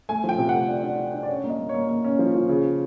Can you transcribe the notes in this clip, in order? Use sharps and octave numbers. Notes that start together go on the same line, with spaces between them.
A3 G#5
F3
G5
C3
A3 F#5
D4
D4
D4
D4
D5
C#4 C#5
A#3
D#5
A#3
C#5
A#3
A#3
C#4
F3
F3
C#3